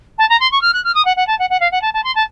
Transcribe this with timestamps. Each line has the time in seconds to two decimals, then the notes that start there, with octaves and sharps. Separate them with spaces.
0.18 A5
0.29 A#5
0.40 C6
0.52 C#6
0.61 F6
0.73 F#6
0.84 F6
0.95 D#6
1.05 F#5
1.17 F#5
1.27 A5
1.39 F#5
1.50 F#5
1.60 F5
1.72 F#5
1.82 A5
1.94 A5
2.04 C6
2.15 A5